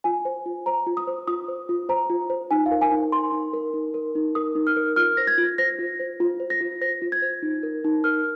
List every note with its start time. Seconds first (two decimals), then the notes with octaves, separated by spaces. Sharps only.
0.04 F4 G#5
0.25 C5
0.46 F4
0.66 C5 A#5
0.87 F4
0.97 D#6
1.07 C5
1.28 F4 D#6
1.48 C5
1.69 F4
1.89 C5 A#5
2.10 F4
2.30 C5
2.51 D#4 G#5
2.66 F5
2.71 A#4
2.81 G#5
2.91 D#4
3.12 A#4 C6
3.32 D#4
3.53 A#4
3.74 D#4
3.94 A#4
4.15 D#4
4.35 A#4 D#6
4.55 D#4
4.67 F6
4.76 A#4
4.96 F4 F6
5.17 C5 A#6
5.27 G#6
5.38 F4
5.58 C5 A#6
5.79 F4
6.00 C5
6.20 F4
6.40 C5
6.50 A#6
6.61 F4
6.81 C5 A#6
7.02 F4
7.12 G#6
7.22 C5
7.42 D#4
7.63 A#4
7.84 D#4
8.04 A#4 F6